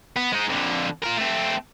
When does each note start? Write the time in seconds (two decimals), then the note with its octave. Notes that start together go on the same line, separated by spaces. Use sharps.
0.16 B3
0.32 G#3 D#4
0.49 F2 D3
1.04 F4 A#4
1.18 A3 C4